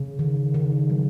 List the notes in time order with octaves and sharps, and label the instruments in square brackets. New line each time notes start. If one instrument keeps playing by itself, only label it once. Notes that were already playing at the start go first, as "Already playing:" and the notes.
Already playing: [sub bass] C#3
[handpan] D#3
D#3
F#3